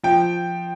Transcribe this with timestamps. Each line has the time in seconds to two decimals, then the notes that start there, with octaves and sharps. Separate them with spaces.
0.03 F3 G5